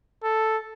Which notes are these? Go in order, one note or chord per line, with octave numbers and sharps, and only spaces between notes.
A4